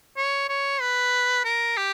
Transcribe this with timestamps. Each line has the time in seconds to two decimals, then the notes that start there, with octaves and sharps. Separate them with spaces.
0.17 C#5
0.49 C#5
0.81 B4
1.45 A#4
1.77 G4